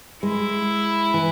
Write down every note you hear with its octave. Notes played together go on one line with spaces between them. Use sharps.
G#3 E4
E3